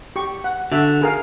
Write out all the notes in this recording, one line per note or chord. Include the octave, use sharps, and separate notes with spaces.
G4 C#6
F#5
D3 F#4 E5
G#4 A#4 F5